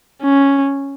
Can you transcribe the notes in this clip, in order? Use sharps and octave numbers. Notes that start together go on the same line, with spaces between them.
C#4